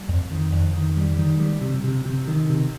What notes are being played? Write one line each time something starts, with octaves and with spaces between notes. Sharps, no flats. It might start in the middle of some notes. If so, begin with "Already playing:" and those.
Already playing: G3
F2
D#3
F2
D#3
G3
D#3
G3
C3
C3
C3
D#3
C3